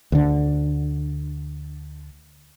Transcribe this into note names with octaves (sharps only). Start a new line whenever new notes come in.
D2 D3